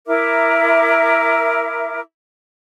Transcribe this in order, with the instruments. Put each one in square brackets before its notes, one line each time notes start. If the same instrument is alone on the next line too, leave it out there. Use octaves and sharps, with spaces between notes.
[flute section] E4 A#4 E5 D6